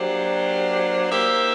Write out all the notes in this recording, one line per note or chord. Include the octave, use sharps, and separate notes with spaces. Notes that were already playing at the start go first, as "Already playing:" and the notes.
Already playing: F#3 A#3 D4 G4 C5
A#3 D#4 G4 C5 E5